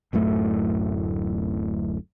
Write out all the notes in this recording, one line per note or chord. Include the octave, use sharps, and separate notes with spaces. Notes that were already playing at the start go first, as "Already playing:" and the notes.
D1 F#2 A2 A3